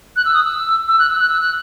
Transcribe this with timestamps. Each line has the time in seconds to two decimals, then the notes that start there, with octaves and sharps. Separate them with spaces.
0.16 F#6
0.25 E6
0.34 D#6
0.44 E6
0.88 E6
0.99 F#6
1.09 E6
1.19 F#6
1.29 E6
1.40 F#6